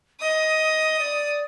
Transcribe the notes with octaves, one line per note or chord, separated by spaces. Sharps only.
D#5 D#6
D5